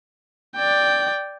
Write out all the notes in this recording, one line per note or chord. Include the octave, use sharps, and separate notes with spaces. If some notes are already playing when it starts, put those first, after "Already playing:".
D5 G5